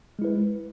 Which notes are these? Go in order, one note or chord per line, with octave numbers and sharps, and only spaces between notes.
G#3 E4 B4